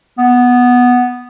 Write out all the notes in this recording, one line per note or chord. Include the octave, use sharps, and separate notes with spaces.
B3